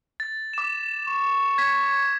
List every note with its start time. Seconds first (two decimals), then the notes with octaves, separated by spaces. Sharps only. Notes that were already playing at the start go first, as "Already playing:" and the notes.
0.20 A6
0.53 D6 E7
1.08 C#6
1.58 G#6 B6